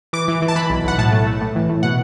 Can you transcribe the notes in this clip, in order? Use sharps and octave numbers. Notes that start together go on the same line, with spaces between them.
E3 D6
E3
E3
A5
E3 B5
B1
B1 F#5
A2 A5
A3
A3
A2
E3
A2
B2 F#5